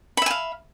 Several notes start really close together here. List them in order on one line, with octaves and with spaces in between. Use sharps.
B5 E5 G#5 F5